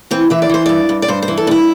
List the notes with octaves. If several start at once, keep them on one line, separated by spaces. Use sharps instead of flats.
E3 C4
E3 E5
D5
E3 C5
G2 D5
G2
D5
G2 C5
C5
E3
A4
G2 D4 E4